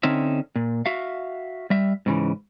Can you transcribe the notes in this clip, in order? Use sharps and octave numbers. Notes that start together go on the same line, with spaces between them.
D3 C4 C#4 D#4 E5
A#2
F#4 E5 F5
G3 E5
G#2 C#3 E3